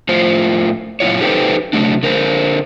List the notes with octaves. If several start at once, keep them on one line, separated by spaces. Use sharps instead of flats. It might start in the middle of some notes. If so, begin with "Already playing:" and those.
A2 F4 C5
F#2 A#2 E4 F4 C#5
D#4 G4 A4 B4 C5 G5
C3 F#3 A3 D4
D3 A#4 C5